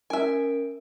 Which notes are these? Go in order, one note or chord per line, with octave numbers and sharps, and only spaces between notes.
C#4 A#4 E5 G#5 D7